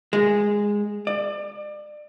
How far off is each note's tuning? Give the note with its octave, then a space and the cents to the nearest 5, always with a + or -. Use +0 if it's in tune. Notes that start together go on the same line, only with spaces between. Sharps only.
G#3 -10
D5 +30